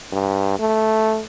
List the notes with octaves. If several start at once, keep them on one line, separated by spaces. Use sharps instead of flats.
G2
A3